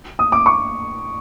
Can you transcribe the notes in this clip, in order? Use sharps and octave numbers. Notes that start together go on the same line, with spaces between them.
D#6
D6
C#6